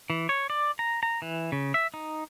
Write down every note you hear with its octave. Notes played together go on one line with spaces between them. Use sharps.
E3
C#5
D5
A#5
A#5
E3
C#3
E5
D#4